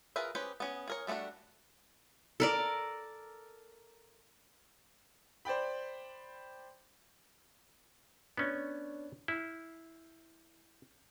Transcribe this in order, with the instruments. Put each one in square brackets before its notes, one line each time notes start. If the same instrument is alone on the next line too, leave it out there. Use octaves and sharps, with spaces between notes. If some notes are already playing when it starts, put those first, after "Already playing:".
[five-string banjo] F4 G#4 A#4 B4 E5
C#4 G4 G#4 B4 C5
B3 C#4 G#4
G#4 A#4 C#5
G3 A3 C4 D4 F#4
[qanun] A4 A#4 D5
[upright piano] C5 D5 G5 B5
[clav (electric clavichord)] B3 C#4 [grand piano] D4 C#5
[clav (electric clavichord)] E4 [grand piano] F6 G6 C7